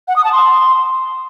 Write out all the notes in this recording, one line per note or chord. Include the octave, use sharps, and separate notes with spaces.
F#5
D#6
A5
C6